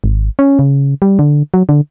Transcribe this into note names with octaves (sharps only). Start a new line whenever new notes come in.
G#1
C#4
C#3
G3
D3
F#3
D3